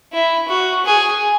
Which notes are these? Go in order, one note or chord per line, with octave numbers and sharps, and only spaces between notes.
E4
F#4
G#4